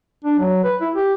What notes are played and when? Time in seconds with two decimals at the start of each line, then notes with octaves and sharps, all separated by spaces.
0.24 D4
0.39 F#3
0.64 B4
0.81 E4
0.95 G4